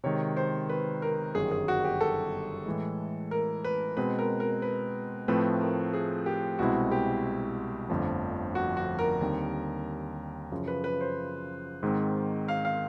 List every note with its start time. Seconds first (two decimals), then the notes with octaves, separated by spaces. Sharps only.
0.04 C3 D#3 G#3 C#5
0.37 C5
0.69 B4
1.02 A#4
1.35 G1 F#2 D#3 G3 G#4
1.51 G#4
1.68 F#4
1.84 G4
2.01 A4
2.66 A2 E3 G#3
3.31 A#4
3.64 B4
3.97 B2 G#3 C4 B4
4.19 A#4
4.40 A#4
4.62 B4
5.28 A2 F3 A3 C4 B4
5.61 A#4
5.93 G#4
6.26 G4
6.59 C2 B2 G#3 C4 E4 F#4
6.91 G4
7.89 G1 F2 D3 F3 A3
8.55 F#4
8.77 F#4
8.99 A#4
9.21 D#2 D3 G3 C4 D#4
10.52 F#2 C#3 F3
10.68 B4
10.84 B4
11.01 C5
11.83 G#2 D#3 G#3 C4
12.48 F5
12.65 F5